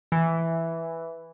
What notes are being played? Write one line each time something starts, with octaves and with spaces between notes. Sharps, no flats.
E3